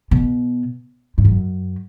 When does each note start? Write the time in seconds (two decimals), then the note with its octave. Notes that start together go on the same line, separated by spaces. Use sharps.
0.11 B2
1.18 G#2
1.25 F#2